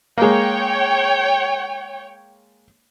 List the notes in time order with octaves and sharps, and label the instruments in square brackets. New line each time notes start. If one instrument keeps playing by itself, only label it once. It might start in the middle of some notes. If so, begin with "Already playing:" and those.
[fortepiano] G#3 A#3 [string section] C#5 G5